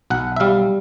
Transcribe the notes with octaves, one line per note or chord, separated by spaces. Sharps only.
B1 F#5
E5
G3 F5